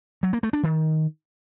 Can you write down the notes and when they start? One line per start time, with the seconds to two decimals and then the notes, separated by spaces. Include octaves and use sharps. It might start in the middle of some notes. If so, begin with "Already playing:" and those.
0.23 F#3
0.33 A#3
0.43 A3
0.53 D4
0.63 D#3